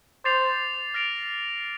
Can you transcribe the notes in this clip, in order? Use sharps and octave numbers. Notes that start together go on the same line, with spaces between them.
C5 D6 A6 C7 F7
F6 A#6 D7 F7